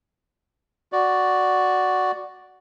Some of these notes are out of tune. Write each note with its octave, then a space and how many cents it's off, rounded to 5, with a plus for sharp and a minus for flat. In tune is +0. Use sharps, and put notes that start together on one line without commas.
F#4 +0 D5 +0